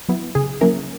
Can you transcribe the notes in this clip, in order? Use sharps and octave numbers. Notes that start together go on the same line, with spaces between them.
F#3 B3 E4
C#3 G#4
F#3 A#3 C#4 E4 A#4